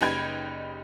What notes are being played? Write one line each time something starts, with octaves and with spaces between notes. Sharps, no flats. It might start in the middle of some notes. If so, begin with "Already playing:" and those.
F#1 G3 D#4 B4 G5 G#6